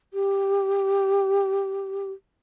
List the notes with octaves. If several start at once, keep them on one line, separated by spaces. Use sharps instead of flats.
G4